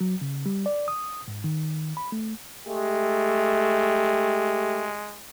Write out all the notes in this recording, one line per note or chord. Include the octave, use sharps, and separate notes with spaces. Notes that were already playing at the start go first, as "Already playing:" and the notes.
F#3
C#3
G3
D5
D#6
G#2
D#3
B5
A3
G#3 A3 G4